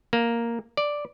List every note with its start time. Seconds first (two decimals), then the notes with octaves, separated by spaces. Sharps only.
0.13 A#3
0.77 D5